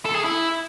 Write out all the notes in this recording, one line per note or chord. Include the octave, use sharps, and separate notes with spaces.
A4
G#4
E4